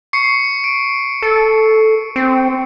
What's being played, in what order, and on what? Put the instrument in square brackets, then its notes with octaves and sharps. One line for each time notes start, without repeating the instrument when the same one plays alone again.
[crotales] C#6 C7 C#7
D7
[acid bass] A4
C4